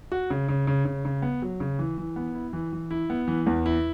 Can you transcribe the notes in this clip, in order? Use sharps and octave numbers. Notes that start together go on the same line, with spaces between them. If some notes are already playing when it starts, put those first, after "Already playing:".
F#4
C#3
C#3
C#3
C#3
C#3
B3
F#3
C#3
E3
E3
B3
E4
E3
E3
E4
B3
E3
E2
E4